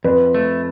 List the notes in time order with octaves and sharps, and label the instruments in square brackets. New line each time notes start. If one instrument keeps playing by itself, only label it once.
[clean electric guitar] F2 [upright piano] B4
[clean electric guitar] A3